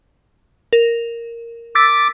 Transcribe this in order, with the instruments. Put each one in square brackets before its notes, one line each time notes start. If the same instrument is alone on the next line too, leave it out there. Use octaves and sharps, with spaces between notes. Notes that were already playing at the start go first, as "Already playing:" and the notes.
[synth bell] A#4
[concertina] D6 [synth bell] E6 A6 B6